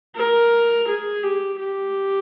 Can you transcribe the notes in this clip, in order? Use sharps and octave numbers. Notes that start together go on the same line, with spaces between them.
A#4
G#4
G4
G4